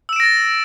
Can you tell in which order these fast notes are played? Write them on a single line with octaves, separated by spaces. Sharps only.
E6 E7 D7 A#6 A6